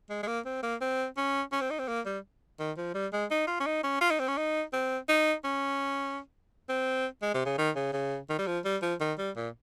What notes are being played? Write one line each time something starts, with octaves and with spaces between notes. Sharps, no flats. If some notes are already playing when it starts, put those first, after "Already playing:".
G#3
G#3
A#3
C4
A#3
C4
C#4
C#4
C4
D#4
C4
A#3
G3
D#3
F3
G3
G#3
D#4
F4
C#4
D#4
C#4
F4
D#4
C4
C#4
D#4
C4
D#4
C#4
C4
G#3
C3
C#3
D#3
C#3
C#3
D#3
G3
F3
G3
F3
D#3
G3
A#2